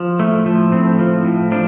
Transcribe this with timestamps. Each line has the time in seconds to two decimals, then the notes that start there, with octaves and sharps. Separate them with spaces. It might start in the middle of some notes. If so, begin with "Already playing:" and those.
Already playing: F3
0.19 A2 A3
0.46 F3
0.72 A2 C4
0.99 F3
1.25 A2
1.52 F3 D4